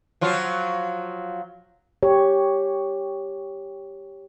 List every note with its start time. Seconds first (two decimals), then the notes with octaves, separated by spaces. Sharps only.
0.21 F3 F#3 F4
2.03 G4 C#5